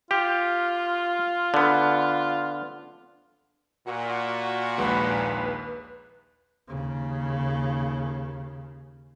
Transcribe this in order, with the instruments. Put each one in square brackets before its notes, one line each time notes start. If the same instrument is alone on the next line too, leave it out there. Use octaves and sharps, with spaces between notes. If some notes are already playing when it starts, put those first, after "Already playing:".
[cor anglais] F4 [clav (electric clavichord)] G4
[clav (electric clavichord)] D3 B3
[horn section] A#2 [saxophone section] F#4
[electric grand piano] A#1 D#2 G#3 [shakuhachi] B4
[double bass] D#2 C#3